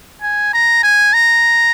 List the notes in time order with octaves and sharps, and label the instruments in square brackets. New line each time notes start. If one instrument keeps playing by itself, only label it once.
[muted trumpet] G#5
A#5
G#5
A#5